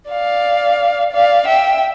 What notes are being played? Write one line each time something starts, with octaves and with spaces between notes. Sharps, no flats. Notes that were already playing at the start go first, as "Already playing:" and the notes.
D5 F5
D5 F5
E5 G5